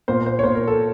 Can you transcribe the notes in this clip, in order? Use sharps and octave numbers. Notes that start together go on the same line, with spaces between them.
A#2 C5
C5
C#5
A#2 C5
A#4
A4